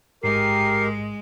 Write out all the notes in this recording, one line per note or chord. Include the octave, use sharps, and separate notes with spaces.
A1 G#2 G#3 G4 A#4 C7